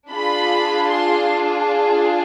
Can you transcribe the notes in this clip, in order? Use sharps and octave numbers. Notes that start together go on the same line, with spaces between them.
D4 F4 G#4 B5
C6